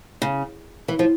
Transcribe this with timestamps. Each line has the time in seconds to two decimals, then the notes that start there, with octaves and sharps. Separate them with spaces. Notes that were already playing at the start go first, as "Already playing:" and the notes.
0.22 C#3
0.88 E3
0.99 F3